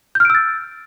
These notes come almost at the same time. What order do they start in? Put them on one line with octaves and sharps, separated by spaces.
G6 F6 D7 E6 A6